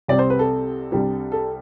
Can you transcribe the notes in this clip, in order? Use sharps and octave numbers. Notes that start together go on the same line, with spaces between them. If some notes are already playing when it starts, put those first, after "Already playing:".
C2 C3 G3 C4 D5
C5
B4
A4
C2 C3 G3 D4
A4